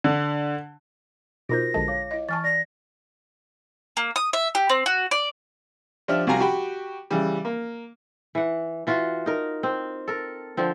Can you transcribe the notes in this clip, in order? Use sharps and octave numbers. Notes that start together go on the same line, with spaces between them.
D3
B2 D#4 F4 F#4 A#4 C5 G6 A#6
A#1 D3 G#3 A5
C#5 F5 D6
E4 D#5
E3 G#5 A5 C#6 F6 A6
D5 A#6
A#3
D#6
E5
G4
C4
F#4
D5
F3 D4 G4 E5 F6
C2 F#4 F5 G#5 A#5
F#4 G4 G5 B5
C#3 E3 G3
A#3
E3 F#5
E3 F4 F#4 F#5
D#4 A#4
C4
A4 A#4
D3 F3 C4